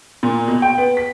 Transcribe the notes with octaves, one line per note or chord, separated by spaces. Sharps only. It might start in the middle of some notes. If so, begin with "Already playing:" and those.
A#2
B2
G5
B3
B6